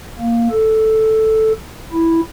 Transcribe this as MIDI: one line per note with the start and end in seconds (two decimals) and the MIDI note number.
0.19 0.48 58
0.51 1.53 69
1.92 2.21 64